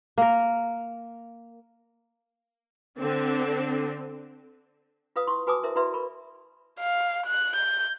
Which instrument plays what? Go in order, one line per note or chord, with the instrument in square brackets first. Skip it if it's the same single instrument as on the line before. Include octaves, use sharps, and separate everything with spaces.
[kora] A#3 A#4
[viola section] D3 C4
[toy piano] F4 B4 F5 D#6
E4 C6 C#6
F#4 B4 G#5 A5 D6 D#6
E4 A#4 C5 E5
E4 F#4 B4 D5 E5 C6
A#4 B5 C#6
[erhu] F5
F#6
G6